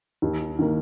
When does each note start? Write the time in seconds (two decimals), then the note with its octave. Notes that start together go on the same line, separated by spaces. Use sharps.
0.22 D#2
0.59 D#3 A#3